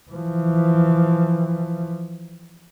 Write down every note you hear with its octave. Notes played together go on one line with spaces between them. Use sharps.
E3 F3